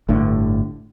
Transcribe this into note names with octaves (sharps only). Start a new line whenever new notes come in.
G1 A2 D3